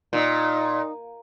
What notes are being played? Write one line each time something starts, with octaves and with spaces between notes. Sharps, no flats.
A#2 D#4